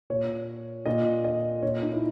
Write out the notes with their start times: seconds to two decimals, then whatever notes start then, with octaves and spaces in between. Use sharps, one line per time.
0.10 A#2 C#5
0.86 A#2 D#5
1.24 D#5
1.62 A#2 C#5
1.82 D#4
1.92 E4